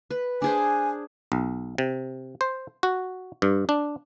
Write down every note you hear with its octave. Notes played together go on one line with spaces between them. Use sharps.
B4
D4 G#4 C5 G#5
B1
C3
C5
F#4
G2
D4